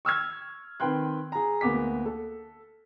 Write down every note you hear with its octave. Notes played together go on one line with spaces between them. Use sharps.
C#6 E6 F6 G#6
D#3 C4 B4 G5 C6 F#6
G#4 A#5
D2 A#3 B3 D6 B6
A4